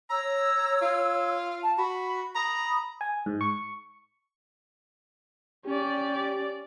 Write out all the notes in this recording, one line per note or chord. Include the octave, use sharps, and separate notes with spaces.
C#5 A#5 E6
F4
A5
F#4 B5
A#5 B5 D#6
G#5
G#2
C#6
C#4 G4 D5